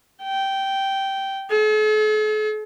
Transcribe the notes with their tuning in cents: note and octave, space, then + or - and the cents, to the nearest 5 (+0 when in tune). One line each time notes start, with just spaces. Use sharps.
G5 -10
A4 -45